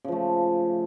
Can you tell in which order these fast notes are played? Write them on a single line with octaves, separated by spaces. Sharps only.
C#3 F3 A3